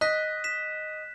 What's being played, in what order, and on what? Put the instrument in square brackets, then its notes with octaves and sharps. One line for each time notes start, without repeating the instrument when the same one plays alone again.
[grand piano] D#5 [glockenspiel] F#6 B6
[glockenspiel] B6 E7